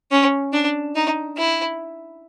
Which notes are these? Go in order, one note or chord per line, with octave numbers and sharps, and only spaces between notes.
C#4
D4
D#4
E4